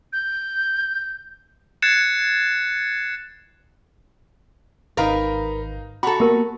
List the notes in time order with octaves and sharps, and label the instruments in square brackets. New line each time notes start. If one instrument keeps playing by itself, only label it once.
[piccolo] G6
[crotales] F#6 G#6 A6 C7 C#7 E7
[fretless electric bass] G#1 [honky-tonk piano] D#4 F5 A#5 [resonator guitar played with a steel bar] A#4 B4
[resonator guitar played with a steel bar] F#4 A4 [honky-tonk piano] A#5 B5
[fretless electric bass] A#3 B3 [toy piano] G4 A#4